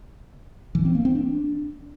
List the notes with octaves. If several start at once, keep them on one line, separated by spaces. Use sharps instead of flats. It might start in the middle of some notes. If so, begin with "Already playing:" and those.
E3
C4
A#3
C4
D4